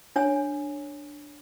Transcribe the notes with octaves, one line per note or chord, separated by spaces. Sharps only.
D4 C#5 G#5